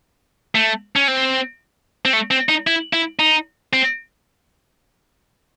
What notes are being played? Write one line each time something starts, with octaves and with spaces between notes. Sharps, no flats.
A3
C#4
C4
C4
A3
C4
D#4
E4
E4
D#4
C4